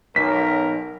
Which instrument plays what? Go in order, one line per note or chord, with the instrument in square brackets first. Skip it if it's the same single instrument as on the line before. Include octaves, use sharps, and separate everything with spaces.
[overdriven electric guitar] B1 [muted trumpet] A#4 [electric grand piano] B6